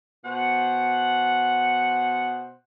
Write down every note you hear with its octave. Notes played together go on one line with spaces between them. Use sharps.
B2 C5 F#5